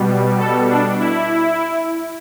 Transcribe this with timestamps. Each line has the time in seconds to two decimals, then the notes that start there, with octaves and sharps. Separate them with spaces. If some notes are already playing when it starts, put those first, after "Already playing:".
Already playing: B2 G3
0.40 A4
0.70 D4
0.99 E4